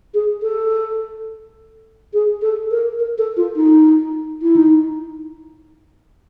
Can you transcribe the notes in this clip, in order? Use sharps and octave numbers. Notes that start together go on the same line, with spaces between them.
G#4
A4
G#4
A4
A#4
A#4
A4
F4
D#4
E4
D#4